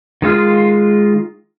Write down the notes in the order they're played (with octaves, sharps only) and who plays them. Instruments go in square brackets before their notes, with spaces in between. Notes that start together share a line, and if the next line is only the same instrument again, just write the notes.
[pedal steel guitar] D#3 G#3 F4 F5